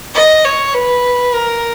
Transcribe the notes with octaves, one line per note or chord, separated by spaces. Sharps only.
D#5
C#5
B4
A#4